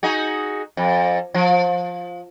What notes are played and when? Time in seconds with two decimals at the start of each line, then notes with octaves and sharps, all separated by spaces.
0.03 D#4 F#4 G#4
0.77 F2
1.34 F3